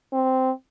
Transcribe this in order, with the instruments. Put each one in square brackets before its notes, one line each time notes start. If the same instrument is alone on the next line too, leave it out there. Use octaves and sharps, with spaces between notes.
[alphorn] C4